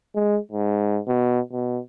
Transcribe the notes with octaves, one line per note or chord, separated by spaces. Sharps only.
G#3
G#2
B2
B2